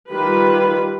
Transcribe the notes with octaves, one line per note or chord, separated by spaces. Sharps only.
D#3 G3 F4 B4